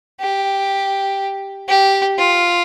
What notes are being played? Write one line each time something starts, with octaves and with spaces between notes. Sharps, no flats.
G4
G4
F4